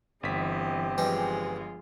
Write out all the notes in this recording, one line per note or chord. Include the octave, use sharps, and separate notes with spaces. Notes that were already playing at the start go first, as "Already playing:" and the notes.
G1 E3 C4 G4 D#5 B6
E3 F3 G3 G#3 D#4 F4